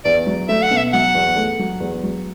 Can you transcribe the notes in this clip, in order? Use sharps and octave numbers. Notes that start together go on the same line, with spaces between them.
E2 D5
F#3
A3 E5
F#5
B2
E5
F#3 F#5
E2
A3
F#3
E2
F#3